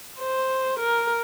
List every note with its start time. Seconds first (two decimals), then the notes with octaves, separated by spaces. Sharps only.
0.19 C5
0.80 A#4